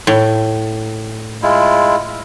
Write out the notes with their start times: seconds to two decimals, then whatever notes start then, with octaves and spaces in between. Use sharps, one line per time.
0.07 A2
1.43 G#3 E4 F4